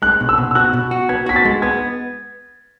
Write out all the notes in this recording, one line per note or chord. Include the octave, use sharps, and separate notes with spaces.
G#3 F#6
B2
E6
B2
E6
F#4 F#6
B2
F#4
B3 G#6
F#4 B6
A6
G#3
B3 G#6